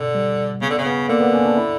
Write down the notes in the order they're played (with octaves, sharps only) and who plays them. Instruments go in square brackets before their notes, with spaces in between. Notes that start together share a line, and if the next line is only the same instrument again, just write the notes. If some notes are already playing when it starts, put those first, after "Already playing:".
Already playing: [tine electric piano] B2 [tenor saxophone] D3
[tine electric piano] G3
[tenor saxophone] C#3 [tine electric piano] B3
[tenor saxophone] D3
C#3
[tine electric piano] B3
[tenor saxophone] D3 [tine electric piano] A#3
[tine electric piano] B3
C#4
D4
E4